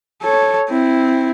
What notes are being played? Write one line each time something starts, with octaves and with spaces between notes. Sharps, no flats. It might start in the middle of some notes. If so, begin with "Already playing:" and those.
A4 C#5
C4 E4